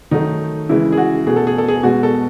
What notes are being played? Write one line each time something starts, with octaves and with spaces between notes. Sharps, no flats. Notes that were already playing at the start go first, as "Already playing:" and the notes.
D#3 F#3 A3 D#4
C#3 E3 G#3 E4
G#4
F#4
B2 A3 G#4
A4
G#4
A4
G#4
B2 G#3 F#4
A4